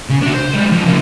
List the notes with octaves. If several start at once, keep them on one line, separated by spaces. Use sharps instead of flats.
C#3
D4 F#4
C5
G3 G#3
F2
C#3 A#3